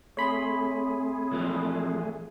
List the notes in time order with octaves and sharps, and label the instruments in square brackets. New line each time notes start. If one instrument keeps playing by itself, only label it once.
[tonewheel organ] A3 G#4 [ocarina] C4 [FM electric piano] C#5 B5 C6
[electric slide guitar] A#2 E3 F3